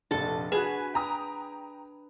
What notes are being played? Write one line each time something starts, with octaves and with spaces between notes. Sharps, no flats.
F1 A#1 D4 A4 A5
F#4 G#4 B4 G#5 E7
G5 A#5 D#6